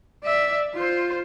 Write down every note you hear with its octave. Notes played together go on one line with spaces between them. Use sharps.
D5 E5
F4 C5